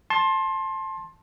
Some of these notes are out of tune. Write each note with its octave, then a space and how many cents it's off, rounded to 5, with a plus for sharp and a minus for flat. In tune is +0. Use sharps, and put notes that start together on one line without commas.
A5 +0 C6 +25